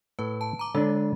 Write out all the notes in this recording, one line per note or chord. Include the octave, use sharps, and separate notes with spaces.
A2 B4
A5
A#5 D6
D3 G#3 D4